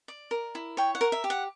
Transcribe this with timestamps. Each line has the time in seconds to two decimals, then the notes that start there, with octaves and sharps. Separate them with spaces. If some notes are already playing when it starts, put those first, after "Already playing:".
0.08 D5
0.31 A#4
0.55 E4
0.77 C#5 G5
0.95 F#5
1.01 A#4
1.12 E5
1.24 G4
1.30 F#5